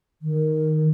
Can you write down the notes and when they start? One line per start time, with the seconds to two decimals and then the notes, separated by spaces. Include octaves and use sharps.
0.22 D#3